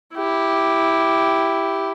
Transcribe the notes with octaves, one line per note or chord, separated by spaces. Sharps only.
E4 G4